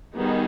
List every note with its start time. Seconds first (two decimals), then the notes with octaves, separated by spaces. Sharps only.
0.15 D#3 G3 B3 D#4 G#4